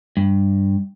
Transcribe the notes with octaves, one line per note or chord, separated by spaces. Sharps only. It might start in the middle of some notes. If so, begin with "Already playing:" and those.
G2